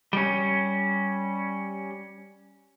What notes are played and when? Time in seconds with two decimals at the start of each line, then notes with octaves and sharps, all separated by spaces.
0.13 G3 C#4